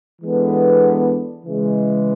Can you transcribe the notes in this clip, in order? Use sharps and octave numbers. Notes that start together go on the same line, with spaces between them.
E3 G#3 B3 D4 A4
C#3 E3 G#3